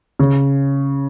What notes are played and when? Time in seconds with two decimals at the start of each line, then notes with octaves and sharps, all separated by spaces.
0.19 C#3